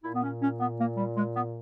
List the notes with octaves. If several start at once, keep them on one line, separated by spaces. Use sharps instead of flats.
A#2 E4
B3
C#4
C#4
B3
A#3
G3
G#3
B3